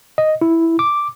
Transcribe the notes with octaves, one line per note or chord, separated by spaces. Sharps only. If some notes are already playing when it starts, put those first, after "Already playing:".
D#5
E4
D6